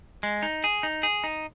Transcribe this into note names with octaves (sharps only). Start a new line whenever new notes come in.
G#3
D#4
G#4
D#4
G#4
D#4